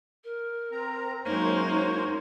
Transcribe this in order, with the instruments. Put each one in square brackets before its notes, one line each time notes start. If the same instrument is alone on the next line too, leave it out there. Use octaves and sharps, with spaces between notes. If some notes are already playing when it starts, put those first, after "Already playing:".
[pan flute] A#4
[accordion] C4 A#5
[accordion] F#2 C5 C#5 [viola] G#3 A#3 [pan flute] D#4